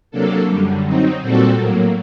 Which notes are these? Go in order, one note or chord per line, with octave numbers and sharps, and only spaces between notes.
C3 F#3 A#3 D4 A4
F#2 D3 G3
F#3 C4 D#4
A#2 G3 C4 F#4 A4
A2 F#3 A#3